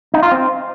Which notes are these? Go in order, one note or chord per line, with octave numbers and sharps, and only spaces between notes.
D#4
F4
C4